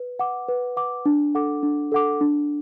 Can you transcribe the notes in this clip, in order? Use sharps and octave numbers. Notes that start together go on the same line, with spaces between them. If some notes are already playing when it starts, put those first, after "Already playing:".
Already playing: B4
F#5 D6
B4
F#5 D6
D4
A4 F#5 D6
D4
A4 F#5 D6
D4